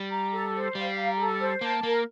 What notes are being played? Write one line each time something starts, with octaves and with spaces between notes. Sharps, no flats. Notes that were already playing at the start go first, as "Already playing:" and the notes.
Already playing: G3
A#5
A4
C5
G3 F5
A#5
A4
C5
A#3 A5
A#3 A#4